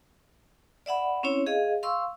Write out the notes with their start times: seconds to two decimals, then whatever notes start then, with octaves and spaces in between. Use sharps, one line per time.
0.86 D5 E5 F#5 B5
1.23 C4 C#4 E4 C#5
1.46 G#4 D#5 F5
1.83 F5 C6 C#6 E6